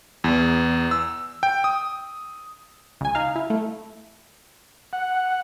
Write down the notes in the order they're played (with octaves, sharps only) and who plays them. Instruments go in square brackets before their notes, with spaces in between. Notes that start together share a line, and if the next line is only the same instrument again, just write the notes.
[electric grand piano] E2
E6
G5
D#6
[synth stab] C#2 G#5
D#4 F5
E4
A3
[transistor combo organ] F#5